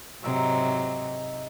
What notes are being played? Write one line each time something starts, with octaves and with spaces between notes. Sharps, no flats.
G#2 C3 F#3 D#4 E5 C#6